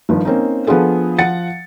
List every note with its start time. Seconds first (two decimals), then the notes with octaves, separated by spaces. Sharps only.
0.09 G1 D#3 F3
0.25 A#3 C4 C#4 D#4
0.67 F3 B3 D4 F4 G#4 A4
1.18 F3 F#5 A6 C#7